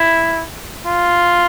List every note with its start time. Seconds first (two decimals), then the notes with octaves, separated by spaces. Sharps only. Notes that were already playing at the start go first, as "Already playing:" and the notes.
Already playing: E4
0.86 F4